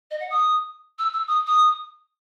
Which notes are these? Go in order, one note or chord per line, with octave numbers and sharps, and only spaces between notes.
D#5
F#5
D#6
E6
E6
D#6
D#6